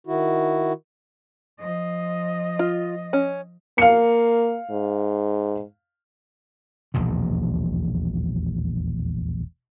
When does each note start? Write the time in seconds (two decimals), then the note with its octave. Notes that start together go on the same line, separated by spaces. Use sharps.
0.07 D#3 E4 F#4
1.59 F3 D#5
2.59 F4
3.13 C#4
3.78 A#3 F5 C#7
4.70 G#2
6.94 E1 A#1 D#2 A#2